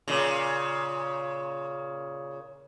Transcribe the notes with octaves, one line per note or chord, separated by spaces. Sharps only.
A#2 C#3